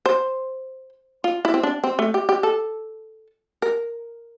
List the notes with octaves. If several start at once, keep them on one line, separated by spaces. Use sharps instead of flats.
C5
F4
E4
C4
D4
C4
A3
G4
G4
A4
A#4